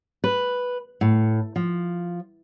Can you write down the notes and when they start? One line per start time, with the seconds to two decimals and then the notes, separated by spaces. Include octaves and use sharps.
0.24 B4
1.01 A2
1.56 F3